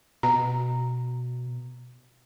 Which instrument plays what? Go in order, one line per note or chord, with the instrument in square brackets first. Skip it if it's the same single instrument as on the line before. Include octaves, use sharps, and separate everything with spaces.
[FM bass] B2 [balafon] A#5